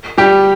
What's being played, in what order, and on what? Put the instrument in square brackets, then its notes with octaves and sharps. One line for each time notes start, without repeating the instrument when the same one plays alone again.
[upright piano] G3 G4